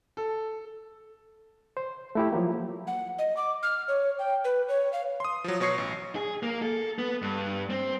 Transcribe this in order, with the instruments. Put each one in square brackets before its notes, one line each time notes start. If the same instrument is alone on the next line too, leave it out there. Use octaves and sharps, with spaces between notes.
[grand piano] A4
[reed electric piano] C5
A3 E4 G4
F3 F#3 A#3
[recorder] F#5
D#5
D6
F6
C#5
G5
B4
C#5
F5
[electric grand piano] C6 D#6
F3 F#3
B2 F#3 C#5 C#6 C7 C#7
A1
[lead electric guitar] G#4
A#3
A4
B3
G2
C4